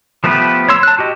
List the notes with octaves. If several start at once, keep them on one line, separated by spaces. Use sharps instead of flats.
F3 A3 B3 G4 B4
C#5 C6 E6
A5 F#6
F#4 G4 D#5